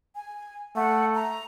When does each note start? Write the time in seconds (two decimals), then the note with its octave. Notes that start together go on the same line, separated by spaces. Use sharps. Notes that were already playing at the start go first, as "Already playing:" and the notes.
0.16 G#5
0.76 A3 F#5
1.15 A#5